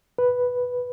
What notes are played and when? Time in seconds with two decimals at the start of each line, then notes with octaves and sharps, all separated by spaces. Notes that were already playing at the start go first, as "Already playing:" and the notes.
0.18 B4